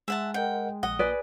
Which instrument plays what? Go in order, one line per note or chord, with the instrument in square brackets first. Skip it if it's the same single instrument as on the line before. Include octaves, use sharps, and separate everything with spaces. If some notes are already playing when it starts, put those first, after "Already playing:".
[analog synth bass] G#3 [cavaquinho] E5 F#5 A5
[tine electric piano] A#4 D#5 F#5 [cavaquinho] G5
[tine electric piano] A#1 [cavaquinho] D#5 [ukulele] F#5
[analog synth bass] A#2 [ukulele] G#4 B4 D5